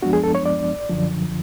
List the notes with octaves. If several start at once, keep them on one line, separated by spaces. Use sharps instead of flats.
F#2 F3 G#3 B3 D4 F#4
G#4
A4
C#5
D5
F#2 D3 F3